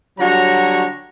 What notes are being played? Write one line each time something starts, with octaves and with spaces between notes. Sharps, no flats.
D3 F#3 G3 F#4 C#5 A#5